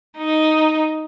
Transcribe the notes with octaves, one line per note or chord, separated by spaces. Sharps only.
D#4